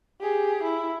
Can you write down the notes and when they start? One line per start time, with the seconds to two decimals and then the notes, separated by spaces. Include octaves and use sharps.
0.21 G4 G#4
0.64 E4